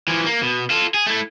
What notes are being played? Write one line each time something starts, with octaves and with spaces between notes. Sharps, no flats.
E3 F3
A#3
B2
F4 A4
G#4
A3 E4